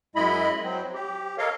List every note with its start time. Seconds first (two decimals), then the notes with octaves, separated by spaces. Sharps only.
0.15 F#2 G#3 E4 D#5 B5
0.64 F#3 C4
0.94 G4
1.38 A4 A#4 C#5 D#5 F5